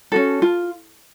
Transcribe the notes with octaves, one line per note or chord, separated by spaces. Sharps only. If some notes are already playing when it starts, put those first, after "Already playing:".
C#4 F#4 A4
F4